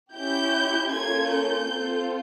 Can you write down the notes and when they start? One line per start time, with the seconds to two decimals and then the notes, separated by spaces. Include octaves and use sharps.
0.15 C#4 E4 G4 G6
0.90 A#3 C#4 F4 A4 G#6
1.30 G6
1.67 C4 F4 A4